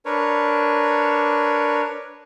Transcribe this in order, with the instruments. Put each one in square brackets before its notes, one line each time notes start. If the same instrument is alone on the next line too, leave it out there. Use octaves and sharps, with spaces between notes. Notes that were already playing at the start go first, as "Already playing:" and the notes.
[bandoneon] D4 A#4 B4 C#5